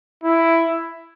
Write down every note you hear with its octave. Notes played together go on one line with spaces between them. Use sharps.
E4